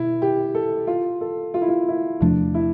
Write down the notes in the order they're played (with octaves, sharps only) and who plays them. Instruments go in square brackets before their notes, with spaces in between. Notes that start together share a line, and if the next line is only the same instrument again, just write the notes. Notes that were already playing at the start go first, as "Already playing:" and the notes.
Already playing: [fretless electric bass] B2 [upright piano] E4
[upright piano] G4
A4
F4
A4
F4
E4
F4
E4
[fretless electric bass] E2 C3 F3 A3 [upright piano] D4
[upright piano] E4